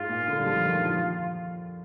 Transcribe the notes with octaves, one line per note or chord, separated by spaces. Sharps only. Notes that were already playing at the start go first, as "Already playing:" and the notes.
Already playing: G#2 F4
A#2
D3
G3
F3
D#3
F3